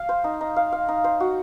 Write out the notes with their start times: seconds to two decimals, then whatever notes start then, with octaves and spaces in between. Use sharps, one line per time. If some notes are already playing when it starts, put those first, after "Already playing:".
Already playing: F5
0.09 C5
0.24 D#4
0.41 D#4
0.56 F5
0.72 F5
0.88 D#4
1.04 C5
1.20 F#4